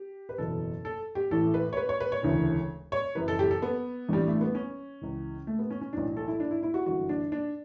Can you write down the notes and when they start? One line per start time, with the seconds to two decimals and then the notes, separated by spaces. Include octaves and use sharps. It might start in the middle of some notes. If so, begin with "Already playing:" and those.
Already playing: G4
0.29 B4
0.38 F#1 E2 B2 A4
0.85 A4
1.15 G4
1.31 A1 A2 E3 A4
1.54 B4
1.73 C#5
1.77 B4
1.89 C#5
2.00 B4
2.12 C#5
2.23 E1 D2 C#3 E3
2.92 C#5
3.15 F#1 F#2 E3 B4
3.28 A4
3.39 G4
3.51 A4
3.62 B3
4.08 A1 G2 E3 G3
4.27 A3
4.41 B3
4.55 C#4
5.01 C#2 C#3 E3
5.47 A3
5.59 B3
5.70 C#4
5.81 C#4
5.93 B1 A2 E3 D4
6.17 A4
6.28 E4
6.40 D4
6.51 E4
6.63 E4
6.74 F#4
6.86 G1 F#2 E3 F#4
7.09 D4
7.32 D4